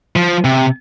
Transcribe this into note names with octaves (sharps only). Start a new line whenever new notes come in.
F3
C3